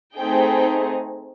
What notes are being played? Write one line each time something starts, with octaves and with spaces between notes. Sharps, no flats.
A3 C4 D#4 G#4 G5